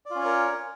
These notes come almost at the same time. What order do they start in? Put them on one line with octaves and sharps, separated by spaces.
D5 F4 C#4 C#5 A#4